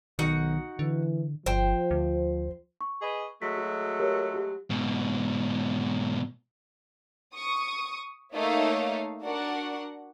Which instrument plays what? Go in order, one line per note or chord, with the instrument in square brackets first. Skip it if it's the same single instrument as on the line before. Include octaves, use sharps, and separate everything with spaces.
[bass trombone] B1 [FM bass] D#3 [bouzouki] D#4 F#4 F#5
[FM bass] D3 [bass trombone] E3
[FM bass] G1 [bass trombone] F3 [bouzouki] C5 G5
[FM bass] D2
[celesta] C#6
[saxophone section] G#4 B4 D#5
[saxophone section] F#3 G#3 A3 [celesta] B6
[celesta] F#4
G4 A#4 C#5
F#4 G4
[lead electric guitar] G#2 B2
[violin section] C#6 D#6
A3 A#3 D#4 C#5 E5 F5
D4 F#4 A#4 F#5